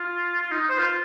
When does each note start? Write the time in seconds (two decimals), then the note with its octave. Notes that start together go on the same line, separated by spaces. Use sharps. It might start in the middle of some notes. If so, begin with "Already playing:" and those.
Already playing: F4
0.42 F4
0.52 D#4
0.69 C5
0.79 F4